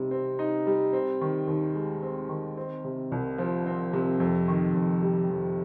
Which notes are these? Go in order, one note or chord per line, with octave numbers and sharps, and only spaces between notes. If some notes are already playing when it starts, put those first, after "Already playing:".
Already playing: C3 G3 D#4
C4
D#4
G3
C4
D#3
D#2
G#3
C4
D#3
C4
C3
C2
F3
C4
C3
F2
D#3
F2
G3
F2